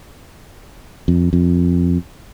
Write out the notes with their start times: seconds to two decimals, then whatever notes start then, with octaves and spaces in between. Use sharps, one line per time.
1.08 F2
1.33 F2